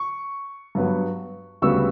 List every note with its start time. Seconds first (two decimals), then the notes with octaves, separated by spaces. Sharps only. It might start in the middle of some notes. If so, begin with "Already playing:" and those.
Already playing: C#6
0.75 G2 F#3 B3
1.62 D2 C#3 G3 B3 C#6 E6